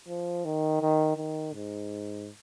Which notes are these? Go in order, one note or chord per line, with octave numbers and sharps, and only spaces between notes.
F3
D#3
D#3
D#3
G#2